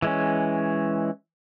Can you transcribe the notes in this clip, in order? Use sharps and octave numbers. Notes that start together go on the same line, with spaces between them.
E3 G#3 C#4